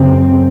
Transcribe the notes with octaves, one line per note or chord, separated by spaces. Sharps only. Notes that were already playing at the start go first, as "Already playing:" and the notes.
Already playing: F#2 C#3 C4